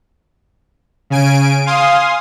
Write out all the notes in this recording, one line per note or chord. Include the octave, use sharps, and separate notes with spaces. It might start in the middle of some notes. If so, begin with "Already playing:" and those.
C#3 G#5 D7
F5 G#5 C6 D#6